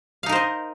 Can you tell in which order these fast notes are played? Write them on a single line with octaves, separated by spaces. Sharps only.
F5 D#4 A#4 C5 D#5